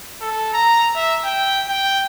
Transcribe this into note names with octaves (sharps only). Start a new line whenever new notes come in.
A4
A#5
E5
G5
G5